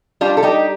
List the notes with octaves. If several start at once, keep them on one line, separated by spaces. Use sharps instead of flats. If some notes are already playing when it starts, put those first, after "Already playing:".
G3 D4 F4
A4
G3 D#4 G4